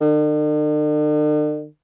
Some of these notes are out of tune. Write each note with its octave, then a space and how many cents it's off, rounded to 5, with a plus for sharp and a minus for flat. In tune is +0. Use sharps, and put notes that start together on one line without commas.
D3 +45